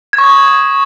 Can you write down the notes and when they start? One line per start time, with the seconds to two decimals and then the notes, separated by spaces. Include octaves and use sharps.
0.13 G#6
0.18 C#6
0.24 D#6